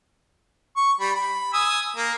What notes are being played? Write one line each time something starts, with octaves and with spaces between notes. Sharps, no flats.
C#6
G3 B5
B5
G#5 D#6 E6
A#3